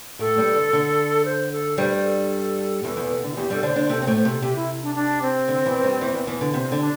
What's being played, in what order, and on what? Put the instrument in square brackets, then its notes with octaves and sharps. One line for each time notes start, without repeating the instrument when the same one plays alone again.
[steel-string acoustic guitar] A2 A3 [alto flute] A4
[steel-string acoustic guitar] G2 G3
D3
D3
[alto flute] C5
A4
[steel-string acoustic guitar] G2 G3 [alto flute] C5
[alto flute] C5
A4
[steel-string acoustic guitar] E2 E3
E2 E3
C3
D3
[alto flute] E4
[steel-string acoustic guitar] E2 E3 [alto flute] G4
[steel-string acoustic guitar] G2 G3 [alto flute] A4
[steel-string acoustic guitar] D3 D4 [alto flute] C5
[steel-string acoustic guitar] D3 D4
[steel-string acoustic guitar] C3 C4 [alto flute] A4
[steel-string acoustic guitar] C4 [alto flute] C5
[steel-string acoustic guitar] A2 A3
[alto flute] C5
[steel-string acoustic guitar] C3 [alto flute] A4
[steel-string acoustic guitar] C3 [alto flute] G4
[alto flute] E4
D4
D4
C4
[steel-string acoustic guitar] D3
E2 E3
G2 G3
E2 E3
E2 E3
E2 E3
D3
[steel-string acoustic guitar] C3 [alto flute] C4
[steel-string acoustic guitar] D3
[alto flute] D4